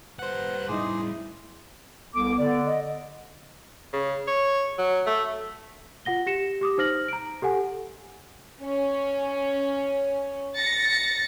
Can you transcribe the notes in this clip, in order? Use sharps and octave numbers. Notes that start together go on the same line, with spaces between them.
G3 B4 C5 F#5 F#6
A2 G3 D#4 E4 G#4 C6 D6
C2 B3 A4 D6
D3 D5
D#5
C#3
C#5
F#3
A3
F4 F#5 A#6 G7
G4 A#6 C#7 E7
G4 D6 D#6
D#4 C5 F6 A#6 F#7
A#5 D7
G4 A4 F#5 G#5
C#4
A6 A#6 C#7